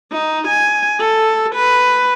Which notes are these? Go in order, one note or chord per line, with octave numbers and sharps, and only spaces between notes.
D#4
G#5
A4
B4